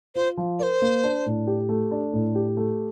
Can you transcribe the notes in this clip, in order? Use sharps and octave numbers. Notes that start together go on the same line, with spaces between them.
F4 C5
F3
A#4 C5 D5
A#3
D4
A2
G4
A3
D4
A2
G4
A3